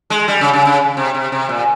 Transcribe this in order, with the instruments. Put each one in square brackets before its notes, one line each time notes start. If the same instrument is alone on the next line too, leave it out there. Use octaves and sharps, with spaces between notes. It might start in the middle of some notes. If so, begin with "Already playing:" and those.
[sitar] G#3
G3
C#3
C#3
C#3
C3
C3
C3
A#2